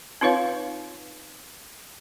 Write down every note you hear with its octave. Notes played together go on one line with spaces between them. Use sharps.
C4 D#4 F4 B4 C#5 F5